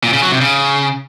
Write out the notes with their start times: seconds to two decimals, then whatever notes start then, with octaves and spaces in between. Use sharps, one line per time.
0.04 A#2
0.13 C#3
0.22 F#3
0.32 C3
0.41 C#3